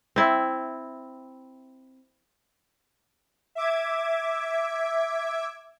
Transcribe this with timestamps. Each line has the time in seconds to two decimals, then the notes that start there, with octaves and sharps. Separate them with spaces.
0.16 C4 E4
3.55 E5 D6 G#6